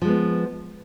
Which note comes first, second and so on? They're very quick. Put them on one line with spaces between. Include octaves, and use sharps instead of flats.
F3 G#3 B3